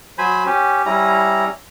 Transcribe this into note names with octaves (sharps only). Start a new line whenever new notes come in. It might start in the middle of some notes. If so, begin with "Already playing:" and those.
F#3 C5 G#5 B5
C#4 G4
G3 C#4 E4 A#5